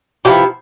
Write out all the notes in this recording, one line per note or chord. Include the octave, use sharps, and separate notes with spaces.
C3 F3 B3 E4 G4